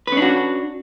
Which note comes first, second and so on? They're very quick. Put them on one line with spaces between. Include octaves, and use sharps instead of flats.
B4 C#4 D4 F#4